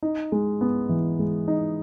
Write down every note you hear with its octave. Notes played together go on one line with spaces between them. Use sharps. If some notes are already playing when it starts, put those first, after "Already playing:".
D#4
G#3
B3
E3
G#3
D#4